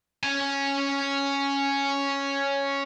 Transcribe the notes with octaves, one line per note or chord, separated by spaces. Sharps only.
C#4 G#5